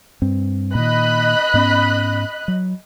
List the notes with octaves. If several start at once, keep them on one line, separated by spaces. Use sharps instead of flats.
G2 C4
A#2 D#3 D#5 B5 F#6
G#2 B3 C#4
F#3